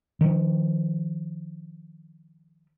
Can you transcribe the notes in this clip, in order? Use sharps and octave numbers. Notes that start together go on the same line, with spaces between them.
D#3 F3